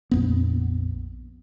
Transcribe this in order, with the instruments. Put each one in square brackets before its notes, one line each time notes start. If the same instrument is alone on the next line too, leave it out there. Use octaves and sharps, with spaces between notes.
[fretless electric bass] A#1 F2 B3